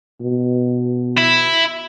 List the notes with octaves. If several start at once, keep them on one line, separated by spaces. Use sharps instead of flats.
B2
E4